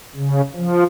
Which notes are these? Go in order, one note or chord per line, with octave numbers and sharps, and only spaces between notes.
C#3
F3